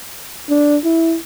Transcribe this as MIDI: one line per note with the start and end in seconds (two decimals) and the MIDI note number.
0.50 0.77 62
0.84 1.16 64